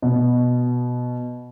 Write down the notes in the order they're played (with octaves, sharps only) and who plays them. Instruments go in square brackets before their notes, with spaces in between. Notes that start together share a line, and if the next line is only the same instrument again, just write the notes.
[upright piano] B2